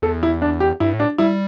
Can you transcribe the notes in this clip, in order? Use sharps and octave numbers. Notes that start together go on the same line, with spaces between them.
E2 A4
E4
D4
G4
G2 E4
A2
D4
G3 E4